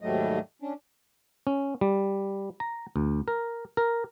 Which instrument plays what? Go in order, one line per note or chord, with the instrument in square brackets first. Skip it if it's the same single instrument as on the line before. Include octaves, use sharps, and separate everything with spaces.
[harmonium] D#2 G#2 F#3 G3 A3 D#5
C#4 D4
[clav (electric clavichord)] C#4
G3
A#5
D2
A#4
A#4